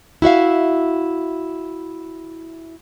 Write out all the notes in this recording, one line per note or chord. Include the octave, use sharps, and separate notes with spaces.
E4 F#4 E5 F5